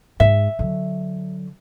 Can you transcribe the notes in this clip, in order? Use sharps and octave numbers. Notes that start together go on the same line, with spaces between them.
G#2 E5
D3 F#3